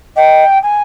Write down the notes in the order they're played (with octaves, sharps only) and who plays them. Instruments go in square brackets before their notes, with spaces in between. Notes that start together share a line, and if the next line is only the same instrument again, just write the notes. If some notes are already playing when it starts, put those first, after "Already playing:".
[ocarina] D#5 [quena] G5
[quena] G#5